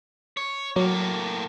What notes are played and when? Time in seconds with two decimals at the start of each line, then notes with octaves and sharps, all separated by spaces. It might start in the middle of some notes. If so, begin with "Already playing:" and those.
0.37 C#5
0.76 A2 F#3 A#3